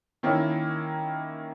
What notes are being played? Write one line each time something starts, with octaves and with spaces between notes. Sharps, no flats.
D#3 A#3 C#4 E4